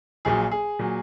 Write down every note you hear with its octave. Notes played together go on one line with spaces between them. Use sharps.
A#1 A#2 F#3 G#4
G#4
A#2 F#3